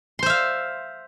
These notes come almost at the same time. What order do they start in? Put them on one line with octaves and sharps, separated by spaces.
C6 C5 E5 F5